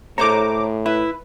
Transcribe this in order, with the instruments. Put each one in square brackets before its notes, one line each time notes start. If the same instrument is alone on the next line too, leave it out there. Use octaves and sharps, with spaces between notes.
[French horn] A2 [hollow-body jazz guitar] A4 C5 C#5 [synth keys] A#5 D6
[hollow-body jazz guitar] E4 [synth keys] B4